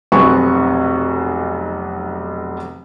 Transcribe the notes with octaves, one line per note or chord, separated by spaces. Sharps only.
F1 B1 B3 C4 G#5 C#6